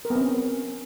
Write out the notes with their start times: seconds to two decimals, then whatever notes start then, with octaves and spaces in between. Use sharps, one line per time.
0.05 A#4
0.10 B3
0.16 C4
0.21 C#4